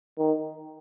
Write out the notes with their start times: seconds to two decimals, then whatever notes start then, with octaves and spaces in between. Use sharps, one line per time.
0.18 D#3